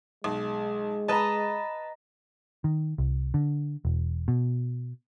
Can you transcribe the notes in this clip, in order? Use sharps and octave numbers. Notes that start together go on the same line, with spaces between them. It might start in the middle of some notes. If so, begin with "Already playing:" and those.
B1 G#3
B4 D#5 A5 A#5
D#3
C2
D3
E1
B2